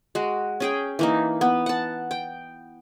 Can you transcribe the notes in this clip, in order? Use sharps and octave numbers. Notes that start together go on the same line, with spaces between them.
G#3 F#4
C#4 G#4 G5
E3 A#3 D#4
B3
F#5 A5
G5